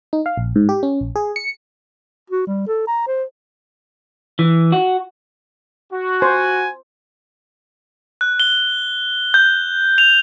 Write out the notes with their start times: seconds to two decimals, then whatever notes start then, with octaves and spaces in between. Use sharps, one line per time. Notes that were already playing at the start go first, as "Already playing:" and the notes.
0.13 D#4
0.26 F5
0.37 A#1
0.56 G#2
0.69 G4
0.83 C#4
1.01 A#1
1.16 G#4
1.36 C#7
2.30 F#4
2.47 G3
2.68 A4
2.87 A#5
3.08 C5
4.39 E3
4.72 F#4
5.93 F#4
6.22 C5 G#5
8.21 F#6
8.40 G7
9.34 G6
9.98 F7